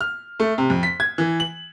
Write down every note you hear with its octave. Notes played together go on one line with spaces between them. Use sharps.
F6
A3
C3
F2
B6
G#6
E3
F#7